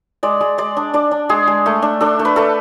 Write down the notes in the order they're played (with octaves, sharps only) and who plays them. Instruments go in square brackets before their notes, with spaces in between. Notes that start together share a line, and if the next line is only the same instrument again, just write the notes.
[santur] G#3 D5
G#3
G#3 D5
D4
D4 D5
D4
G#3 G#4
G#3
A3
D4
D4 A4
A3
B4
A3 A4